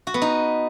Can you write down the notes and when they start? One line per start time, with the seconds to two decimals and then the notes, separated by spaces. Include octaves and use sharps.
0.07 F#4
0.14 B3
0.22 D#4